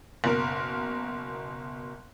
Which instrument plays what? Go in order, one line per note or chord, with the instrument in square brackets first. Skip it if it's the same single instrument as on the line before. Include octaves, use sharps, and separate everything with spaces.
[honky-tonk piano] F#1 B2 A#4